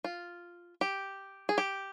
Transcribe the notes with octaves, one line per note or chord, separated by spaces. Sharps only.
F4
G4
G#4
G4